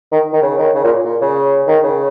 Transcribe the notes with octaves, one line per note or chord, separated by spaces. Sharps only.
D#3
D#3
C#3
D#3
C#3
A#2
A#2
C#3
D#3
C#3